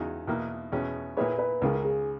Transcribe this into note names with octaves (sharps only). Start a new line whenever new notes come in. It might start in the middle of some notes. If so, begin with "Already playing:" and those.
Already playing: E2 C#3 G#3 D#4 F#4
E2 B2 A#3
E2 B2 G#3 C#4
A#2 A#3 E4 G#4 B4 C#5
B4
C#2 C#3 G#3 A#4
G#4